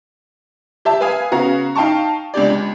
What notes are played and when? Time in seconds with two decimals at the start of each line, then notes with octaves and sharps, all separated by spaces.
0.85 G4 E5 A5
1.01 B4 E5 F5 G#5 D#6
1.32 C#3 B3 F#4 F5 A#5
1.76 D#4 F5 G5 A5 C#6
2.34 C#2 D4 G4 D5
2.50 C#2